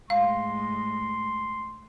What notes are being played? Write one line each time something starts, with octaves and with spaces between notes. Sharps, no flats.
A2 G#3 F5 C6